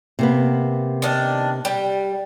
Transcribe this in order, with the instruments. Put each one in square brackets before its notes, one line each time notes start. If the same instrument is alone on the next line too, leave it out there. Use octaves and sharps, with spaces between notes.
[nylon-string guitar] C3 A#3 B3
[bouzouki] D#3 D4
G3